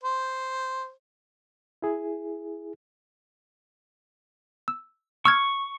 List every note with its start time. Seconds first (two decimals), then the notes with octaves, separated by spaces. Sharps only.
0.04 C5
1.82 E4 G#4
4.68 E6
5.25 C#6 E6 F6 G#6